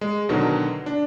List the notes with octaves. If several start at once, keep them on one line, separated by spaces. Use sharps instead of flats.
G#3
B2 D3 D#3 F#3
D4